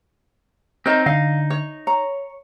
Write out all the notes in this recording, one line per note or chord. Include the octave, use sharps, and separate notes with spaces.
C4 D#4 A#4 C#5 D#5
D3 D#4 F5
C#5
C#5 A#5